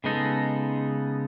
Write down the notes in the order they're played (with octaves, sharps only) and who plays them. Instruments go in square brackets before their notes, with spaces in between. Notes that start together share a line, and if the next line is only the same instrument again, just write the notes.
[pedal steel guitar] C#3 G#3 B3 D#4 A4